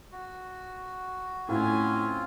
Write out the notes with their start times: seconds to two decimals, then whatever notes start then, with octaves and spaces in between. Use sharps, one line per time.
0.12 F#4
1.49 A2 C4 C#4 F4 G#5